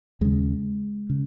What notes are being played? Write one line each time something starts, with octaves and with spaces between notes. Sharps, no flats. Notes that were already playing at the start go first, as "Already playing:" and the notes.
D#2 C#3 G#3
C#3